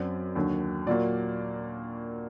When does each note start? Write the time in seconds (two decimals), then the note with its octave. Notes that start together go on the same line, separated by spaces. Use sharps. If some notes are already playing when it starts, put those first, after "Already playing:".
Already playing: F#2 F#3 C4 D5
0.35 D#2 D3 F#3
0.87 A#2 F#3 A#3 D5